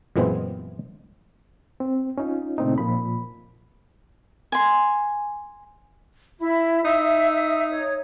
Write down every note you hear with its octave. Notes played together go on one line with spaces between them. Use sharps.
F#2 A#2 E3 G#3 B3 C4
C4
C#4 D#4 F4
A#2 C#3 A3 C4 D4 D#4
A#2 F3 B5
G#5 C6
E4
D#4 E5 E6
C#5